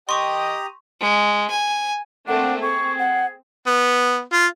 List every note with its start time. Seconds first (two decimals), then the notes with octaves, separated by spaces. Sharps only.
0.09 G4 D#5 G5 A#5 C6 C#6 D#6
1.01 G#3
1.50 G#5
2.28 A3 A#3 C4 D4 F#5
2.62 C4 G#4 C#6
2.99 F#5
3.67 B3
4.33 F4